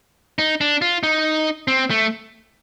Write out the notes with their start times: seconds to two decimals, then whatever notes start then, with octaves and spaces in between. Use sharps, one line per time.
0.39 D#4
0.61 D4
0.82 F4
1.03 D#4
1.68 C4
1.91 A3